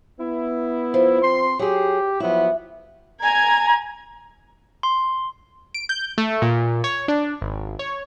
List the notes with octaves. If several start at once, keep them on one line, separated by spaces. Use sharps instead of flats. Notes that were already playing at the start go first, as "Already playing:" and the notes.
B3 E4
F3
C4 C6
F#3 G4 G#4
F3 F#3 B3 E4
G#5 A#5 G#6
C6
D7
G6
A3
A#2
C#5
D4
G#1
C#5